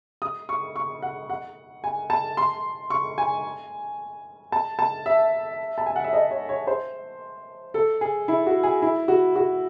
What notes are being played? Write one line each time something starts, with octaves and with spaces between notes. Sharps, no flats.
D#6
C#6
C#6
F#5
F#5
G#5
A5
C6
C#6
G#5
A5
A5
E5
A5
G#5
F#5
E5
D#5
C#5
C#5
C5
A4
G#4
E4
F#4
G#4
E4
F#4
F#4